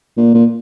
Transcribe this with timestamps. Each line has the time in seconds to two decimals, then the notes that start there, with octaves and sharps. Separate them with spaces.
0.17 A#2
0.34 A#2